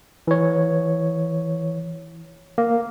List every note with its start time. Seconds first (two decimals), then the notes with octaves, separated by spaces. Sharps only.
0.27 E3 C#5
2.58 A#3